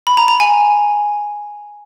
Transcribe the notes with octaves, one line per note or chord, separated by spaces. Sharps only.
B5
A#5
A#5
G#5